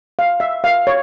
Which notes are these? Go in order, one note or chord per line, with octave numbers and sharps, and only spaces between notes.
F5
E5
F5
C#5